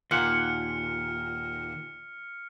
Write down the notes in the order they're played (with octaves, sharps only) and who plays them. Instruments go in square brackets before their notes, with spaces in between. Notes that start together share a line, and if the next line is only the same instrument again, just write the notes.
[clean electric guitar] D#2 F#5 [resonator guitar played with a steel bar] A#2 [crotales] F6 C#7